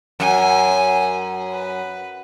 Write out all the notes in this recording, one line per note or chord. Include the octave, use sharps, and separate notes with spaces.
F#2 G#5
B4